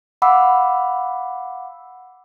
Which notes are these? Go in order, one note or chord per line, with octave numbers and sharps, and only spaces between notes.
F5 F#5 B5 D6 E6